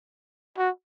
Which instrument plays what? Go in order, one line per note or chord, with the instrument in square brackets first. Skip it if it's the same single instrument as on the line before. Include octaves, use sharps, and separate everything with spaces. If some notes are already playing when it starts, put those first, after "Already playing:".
[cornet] F#4